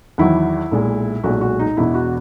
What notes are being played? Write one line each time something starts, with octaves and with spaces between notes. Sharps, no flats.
E2 D#3 F#3 E4
B1 A#2 G#3
B1 A#2 G#3 F#4
F#4
D#4
E1 E2 B2 E4
F#4